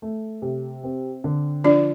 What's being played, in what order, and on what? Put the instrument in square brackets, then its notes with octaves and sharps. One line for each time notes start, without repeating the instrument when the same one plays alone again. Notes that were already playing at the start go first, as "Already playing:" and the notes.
[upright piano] A3
C3
C4
D3
[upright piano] F3 [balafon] D4 D5